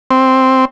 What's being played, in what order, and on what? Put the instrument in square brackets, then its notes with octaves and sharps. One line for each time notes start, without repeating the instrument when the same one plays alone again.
[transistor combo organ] C4